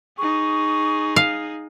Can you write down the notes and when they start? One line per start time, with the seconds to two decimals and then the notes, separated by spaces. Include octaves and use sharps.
0.18 D#4 G#4 C#6
1.16 F5